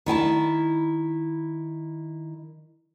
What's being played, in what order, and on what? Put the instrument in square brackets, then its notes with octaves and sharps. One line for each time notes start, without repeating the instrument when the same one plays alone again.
[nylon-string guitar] D#3 E4 G#5 A5